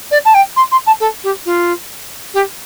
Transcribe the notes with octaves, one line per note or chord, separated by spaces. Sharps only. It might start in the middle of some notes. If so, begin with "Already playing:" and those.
D5
A5
G5
C6
C6
A5
A4
G4
F4
G4